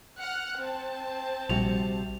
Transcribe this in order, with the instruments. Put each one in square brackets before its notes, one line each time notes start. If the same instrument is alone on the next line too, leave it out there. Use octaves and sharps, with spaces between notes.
[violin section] F#5 F6 F#6
C4 A5
[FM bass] A#1 [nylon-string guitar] C3 G3 F#4 [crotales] F7